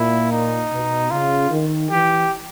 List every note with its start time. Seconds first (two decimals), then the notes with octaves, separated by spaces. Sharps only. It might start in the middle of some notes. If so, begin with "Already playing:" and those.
Already playing: A#2 E4
0.32 D#4
0.72 B2
1.11 C#3 F4
1.51 D#3
1.91 E3 G4